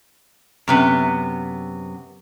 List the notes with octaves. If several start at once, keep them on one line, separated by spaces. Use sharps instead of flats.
F#2 C3 B3